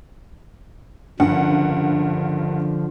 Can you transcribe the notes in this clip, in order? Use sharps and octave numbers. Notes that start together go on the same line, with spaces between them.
F#1 G2 D3 F3 F#5